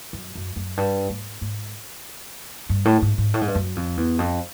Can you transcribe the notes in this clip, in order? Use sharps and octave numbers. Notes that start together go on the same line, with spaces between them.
F#2
F#2
F#2
G2
G#2
G#2
G2
A2
G#2
G#2
A2
G#2
G2
F#2
F2
E2
F2